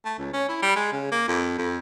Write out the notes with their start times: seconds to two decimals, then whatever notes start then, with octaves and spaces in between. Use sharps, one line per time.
0.05 A3
0.18 C#2
0.33 C#4
0.49 E4
0.62 G3
0.76 G#3
0.92 C#3
1.11 A#3
1.28 F2
1.58 F2